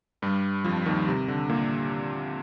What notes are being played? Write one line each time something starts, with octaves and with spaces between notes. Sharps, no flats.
G2 G3
F2 F3
D#2 D#3
C3
D3
A#2 A#3